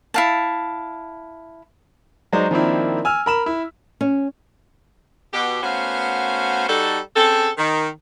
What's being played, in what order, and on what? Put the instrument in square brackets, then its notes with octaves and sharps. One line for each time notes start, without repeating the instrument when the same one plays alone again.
[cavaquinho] E4 F5 A5
[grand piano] F#3 G#3 D#4 C5 D5
D#3 F3 A#3 C4 D4 E4
G#5 E6 F6
A#4 B5 E7
E4
[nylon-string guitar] C#4
[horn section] B2 G4
A3 B3 C#4 F#4 C5 F5
G3 D#4 F#4 A4
C4 C#4 G#4 A4
D#3